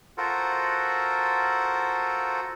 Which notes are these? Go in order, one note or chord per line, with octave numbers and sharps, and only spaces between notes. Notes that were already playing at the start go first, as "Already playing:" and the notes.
F4 F#4 A4 A#4 C5 F#5